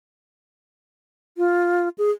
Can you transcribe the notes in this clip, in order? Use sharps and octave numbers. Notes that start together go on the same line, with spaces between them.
F4
G#4